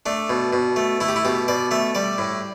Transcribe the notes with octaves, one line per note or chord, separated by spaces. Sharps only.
A3 D4
B2
B2
A3
A3 E4
G4
E4
B2 G4
B2 D5
A3 E5
G3 D5
A2